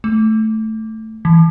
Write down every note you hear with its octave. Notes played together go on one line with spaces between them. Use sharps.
A3
E3